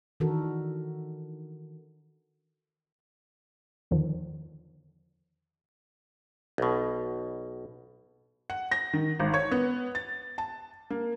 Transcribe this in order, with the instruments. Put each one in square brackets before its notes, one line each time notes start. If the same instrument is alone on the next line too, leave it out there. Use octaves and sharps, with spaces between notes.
[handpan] D#3 E3 D4 F#4 A4 A#4
[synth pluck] E2 D3 D#3 F3
[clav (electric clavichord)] B1 B2
[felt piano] F#5
A#6
D#3
G#1
C#5
B3
A6
A5
A#3